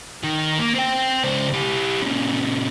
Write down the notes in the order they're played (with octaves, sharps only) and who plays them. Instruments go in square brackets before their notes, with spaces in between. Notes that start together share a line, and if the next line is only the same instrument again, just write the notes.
[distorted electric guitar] D#3
A#3
C4 G5
C#2 C5
E4 G4
A#2 C#3